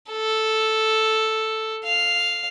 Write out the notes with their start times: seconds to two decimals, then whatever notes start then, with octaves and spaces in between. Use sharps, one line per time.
0.10 A4
1.84 F5